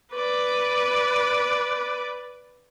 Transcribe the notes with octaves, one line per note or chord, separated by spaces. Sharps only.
B4 D5